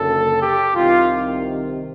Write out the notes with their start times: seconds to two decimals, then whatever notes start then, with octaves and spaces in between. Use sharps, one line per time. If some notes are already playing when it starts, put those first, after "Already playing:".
Already playing: F#1 F#2 D3 A4
0.39 G4
0.74 C2 C3 D#3 F4